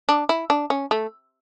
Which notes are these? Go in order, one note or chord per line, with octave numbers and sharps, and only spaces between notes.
D4
E4
D4
C#4
A3